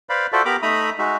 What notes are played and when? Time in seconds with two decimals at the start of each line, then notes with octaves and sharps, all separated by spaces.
0.09 B4 C5 D5 F5 B5
0.33 F4 F#4 A4 C5 D5 E5
0.45 B3 G4 A#4 A#5 B5 D6
0.62 A3 D#4 E5 A#5 B5 D#6
0.99 G#3 D#4 F#4 E5